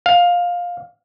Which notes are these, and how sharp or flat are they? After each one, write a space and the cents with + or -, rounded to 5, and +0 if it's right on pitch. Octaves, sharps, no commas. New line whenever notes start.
F5 +15